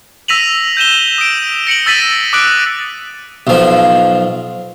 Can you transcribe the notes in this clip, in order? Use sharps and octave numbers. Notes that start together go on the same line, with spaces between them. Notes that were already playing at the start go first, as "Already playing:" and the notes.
E6 A#6 B6 D#7 F7 F#7
G6 D#7 E7 G7
D#6 D7
A#6 C#7 D7 F#7
E6 A6 B6 D#7 F#7
D6 D#6 F#6 D7 F#7
B1 F3